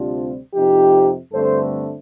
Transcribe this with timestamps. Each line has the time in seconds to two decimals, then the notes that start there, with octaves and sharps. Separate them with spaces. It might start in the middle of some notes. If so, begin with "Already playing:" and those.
Already playing: D2 C3 G3 C4 D4 F4
0.54 F2 C3 F3 D#4 G4
1.33 G2 D3 A3 C4 A4 C5